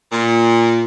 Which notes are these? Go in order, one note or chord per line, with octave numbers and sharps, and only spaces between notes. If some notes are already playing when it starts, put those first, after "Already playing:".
A#2